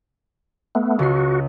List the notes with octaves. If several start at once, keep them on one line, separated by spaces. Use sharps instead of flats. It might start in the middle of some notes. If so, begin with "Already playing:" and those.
A3 B3
C#2 F#4 C7